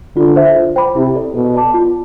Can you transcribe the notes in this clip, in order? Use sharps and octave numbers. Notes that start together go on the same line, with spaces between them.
D3 F4
C5 E5
F4
C5 G5 B5 D6
C3 E4
A4 D5
B2 A4
D5 A5 D6
F4